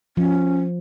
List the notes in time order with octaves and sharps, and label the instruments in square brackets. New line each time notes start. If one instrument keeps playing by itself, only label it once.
[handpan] F3 [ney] C#4